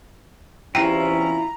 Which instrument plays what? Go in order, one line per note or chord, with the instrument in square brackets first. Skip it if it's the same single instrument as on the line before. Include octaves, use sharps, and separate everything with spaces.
[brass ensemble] E2 C3 C#4 [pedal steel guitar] E4 F4 [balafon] G5 [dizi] A#5